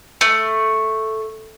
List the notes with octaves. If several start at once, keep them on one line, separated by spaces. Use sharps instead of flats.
A3